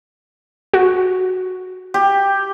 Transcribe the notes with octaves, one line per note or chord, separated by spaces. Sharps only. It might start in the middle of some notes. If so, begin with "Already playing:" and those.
F#4
G4